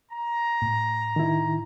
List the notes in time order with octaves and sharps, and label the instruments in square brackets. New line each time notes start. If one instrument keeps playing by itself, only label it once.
[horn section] A#5
[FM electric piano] A2
[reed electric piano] D#3 E4